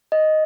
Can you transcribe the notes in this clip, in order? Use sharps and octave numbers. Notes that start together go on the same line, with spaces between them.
D#5